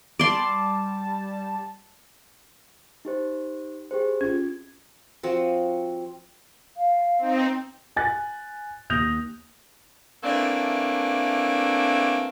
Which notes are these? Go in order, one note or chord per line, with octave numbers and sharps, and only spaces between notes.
G3 D5 A5 C6
D#4 G4 C5
G4 G#4 C5
C#4 F4 G#6
F3 C4 F#4
F5
C4 D#4
G#5 F#6 A6
D#2 D#6 G6 A#6 F7
E3 A3 A#3 C4 D4